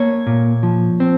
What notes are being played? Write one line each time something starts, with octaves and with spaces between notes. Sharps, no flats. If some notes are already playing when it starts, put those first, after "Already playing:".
Already playing: A#3 C#5
A#2
F3
C4